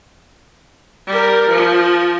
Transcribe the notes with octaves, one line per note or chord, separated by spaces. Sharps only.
G3 A#4
F3